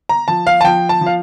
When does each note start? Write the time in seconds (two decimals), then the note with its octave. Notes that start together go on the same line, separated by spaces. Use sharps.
0.09 A#5
0.28 F3 A5
0.47 F5
0.61 A5
0.64 F3 G5
0.89 A5
1.01 F3
1.06 F5